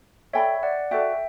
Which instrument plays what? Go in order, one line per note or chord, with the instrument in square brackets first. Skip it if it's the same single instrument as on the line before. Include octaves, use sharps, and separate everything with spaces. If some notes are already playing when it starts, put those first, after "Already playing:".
[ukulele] A4 D5 G5 B5 [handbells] C#5 E5
[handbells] D5 F#5
[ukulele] F#4 A4 D5 [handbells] E5 G5